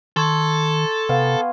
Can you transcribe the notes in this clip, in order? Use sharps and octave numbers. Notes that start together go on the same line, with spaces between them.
D#3 A4 C6 C#6 G#6
C3 B3 F5 G5